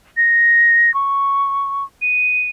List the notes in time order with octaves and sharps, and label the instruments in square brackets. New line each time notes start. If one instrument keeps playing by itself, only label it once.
[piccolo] A#6
C#6
D#7